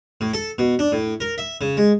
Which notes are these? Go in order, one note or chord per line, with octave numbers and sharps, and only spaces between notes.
A2
A4
B2
D4
A2
A#4
E5
C#3
G#3